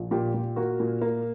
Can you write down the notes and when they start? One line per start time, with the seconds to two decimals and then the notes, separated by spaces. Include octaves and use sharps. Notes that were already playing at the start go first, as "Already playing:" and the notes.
Already playing: A#1
0.11 A#2 G4
0.34 A#2
0.56 A#3 F#4
0.80 A#2
1.01 A#3